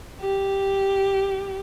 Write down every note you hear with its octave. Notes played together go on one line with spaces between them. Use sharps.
G4